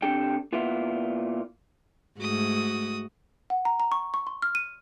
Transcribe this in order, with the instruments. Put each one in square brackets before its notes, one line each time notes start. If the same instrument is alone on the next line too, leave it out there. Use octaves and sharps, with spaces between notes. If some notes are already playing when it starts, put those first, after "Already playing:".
[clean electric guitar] C3 D4 G4 A4 G5
A#2 B3 E4 F4
[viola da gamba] G#2 A3 [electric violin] F#4 D#6
[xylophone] F#5
A#5
A#5
C#6
C#6
C6
F6
D#7